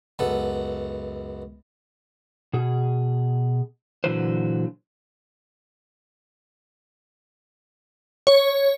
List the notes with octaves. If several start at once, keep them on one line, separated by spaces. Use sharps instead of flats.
C#2 F#2 B3 A4
B2 G#4
A#2 D3 E3 F#3 B4 C5
C#5